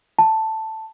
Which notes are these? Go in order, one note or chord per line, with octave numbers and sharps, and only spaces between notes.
A5